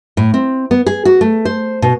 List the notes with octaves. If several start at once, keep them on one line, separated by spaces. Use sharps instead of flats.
A2
C4
B3
G#4
F#4
A3
C5
B2